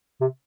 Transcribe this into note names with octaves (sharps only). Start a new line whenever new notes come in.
C3